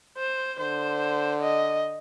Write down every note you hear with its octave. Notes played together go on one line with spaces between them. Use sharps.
C5
D3 C5
D#5